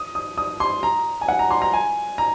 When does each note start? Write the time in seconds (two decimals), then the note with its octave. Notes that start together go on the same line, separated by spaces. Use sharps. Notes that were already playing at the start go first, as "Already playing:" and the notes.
Already playing: D#6
0.15 D#6
0.38 D#6
0.60 C6
0.83 A#5
1.21 G#5
1.28 F#5
1.39 A#5
1.51 C6
1.62 A#5
1.73 G#5
2.18 A#5